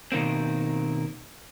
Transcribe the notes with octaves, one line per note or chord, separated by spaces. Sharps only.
B2 D#3 A#3 C4